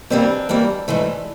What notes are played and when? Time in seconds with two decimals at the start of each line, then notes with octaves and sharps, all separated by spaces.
0.10 G2 E3 G3 A#3 C4 D4
0.49 G2 E3 G3 A#3
0.88 G#2 E3 A3